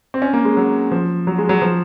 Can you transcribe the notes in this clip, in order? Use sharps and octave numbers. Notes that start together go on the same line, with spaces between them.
C4
C#4
A#3
G#3
F#3
F3
F#3
G#3
F#3
F3